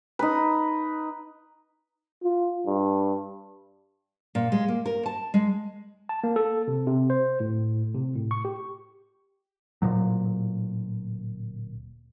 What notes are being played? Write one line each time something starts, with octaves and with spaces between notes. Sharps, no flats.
D#4 B4
F4
G2
A#2
G#3
A#3
A#4
A5
G#3
A5
A#3
A4
C3
C3
C5
A2
C3
A2
C#6
G4
D1 A#2 F#3